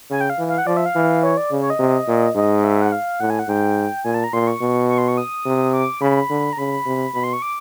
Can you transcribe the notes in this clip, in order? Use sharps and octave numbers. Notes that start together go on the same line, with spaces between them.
C#3 G#5
G5
F5
E3
F5
F#5
F3 D5
E5
F5
E3
C#5
D5
C#3
C#5
D#5
C3
A#2
G#2 D#5
E5
F#5
F5
A2 F#5
G#5
F#5
G#2 G5
A#2 G#5
A5
A#5
A#2 C6
C#6
B2
C#6
C6
C#6
D#6
C3
D6
C#3 B5
D3
A#5
C#3 B5
C3
B2 B5
C6
C#6
D6